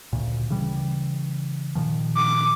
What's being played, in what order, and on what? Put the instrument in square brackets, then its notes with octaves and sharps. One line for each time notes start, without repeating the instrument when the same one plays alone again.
[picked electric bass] D2 A#2
C#3 E3 G3
A#2 D#3 F3
[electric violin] D6